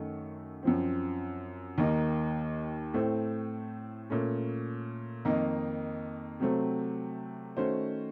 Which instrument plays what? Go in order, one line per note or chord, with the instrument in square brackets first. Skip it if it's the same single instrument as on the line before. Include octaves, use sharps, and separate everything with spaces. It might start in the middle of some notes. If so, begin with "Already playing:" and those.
Already playing: [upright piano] F#2 D#3 A3
F#2 F3 C4
D#2 D#3 A#3 D#4
A2 A3 C4
A#2 A3 C#4
F2 D#3 A#3 D#4
C3 F#3 A3 C4
D#3 A3 C#4 F#4 C5